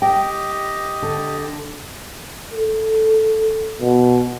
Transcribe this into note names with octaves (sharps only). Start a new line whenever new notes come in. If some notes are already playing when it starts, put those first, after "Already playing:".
G4 D#5 G5
D3
A4
B2